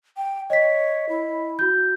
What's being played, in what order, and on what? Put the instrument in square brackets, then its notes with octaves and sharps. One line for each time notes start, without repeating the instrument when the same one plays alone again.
[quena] G5
[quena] C#5 [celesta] D#5 B6
[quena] E4
[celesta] F#4 G6